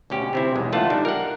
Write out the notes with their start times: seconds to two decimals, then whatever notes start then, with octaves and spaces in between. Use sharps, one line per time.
0.10 D2 B2 C#4 G4
0.33 C3 C4 E4
0.56 B1 E2 G#3
0.72 C#2 E3 A3 F4 F#5 A5
0.90 G3 D4 D#4
1.05 A#4 F#5